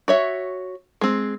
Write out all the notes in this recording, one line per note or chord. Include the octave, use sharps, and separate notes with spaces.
F#4 C#5 E5
G#3 C4